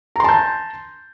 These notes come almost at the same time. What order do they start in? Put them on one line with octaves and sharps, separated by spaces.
A#5 C6 A5 G6